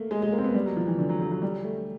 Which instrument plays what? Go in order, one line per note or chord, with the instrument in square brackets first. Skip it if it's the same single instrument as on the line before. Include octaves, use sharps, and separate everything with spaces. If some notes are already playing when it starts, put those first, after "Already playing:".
Already playing: [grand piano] A3 A#3
G#3
G#3
A#3
C4
B3
G3
F#3
F3
E3
D3
F#3
F#3
F#3
G3
A3